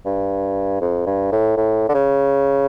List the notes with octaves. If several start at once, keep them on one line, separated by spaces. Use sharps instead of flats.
G2
F2
G2
A2
A2
D3
C#3